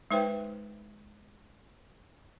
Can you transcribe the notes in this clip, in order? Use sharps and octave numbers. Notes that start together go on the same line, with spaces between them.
G#3 D#4 B4 C5 E5 G5